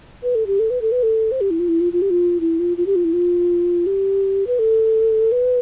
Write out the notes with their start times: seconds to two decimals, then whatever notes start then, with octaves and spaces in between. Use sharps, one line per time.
0.23 B4
0.35 A4
0.47 G4
0.59 A4
0.70 B4
0.81 A4
0.92 B4
1.03 A4
1.31 C5
1.41 G4
1.50 E4
1.59 F4
1.68 E4
1.80 F4
1.93 F4
2.02 G4
2.10 F4
2.40 E4
2.59 F4
2.77 F4
2.86 G4
2.95 F4
3.04 E4
3.13 F4
3.86 G4
4.47 B4
4.59 A4
5.32 B4